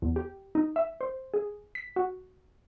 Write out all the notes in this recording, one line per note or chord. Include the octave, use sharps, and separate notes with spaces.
E2
G4
D#4
E5
C5
G#4
B6
F#4